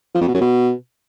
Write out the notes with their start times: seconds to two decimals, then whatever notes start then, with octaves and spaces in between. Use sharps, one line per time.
0.15 F3
0.21 F2
0.28 B2
0.35 F#2
0.41 B2